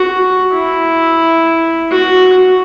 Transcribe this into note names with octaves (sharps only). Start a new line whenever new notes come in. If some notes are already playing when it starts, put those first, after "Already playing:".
Already playing: F#4
E4
F#4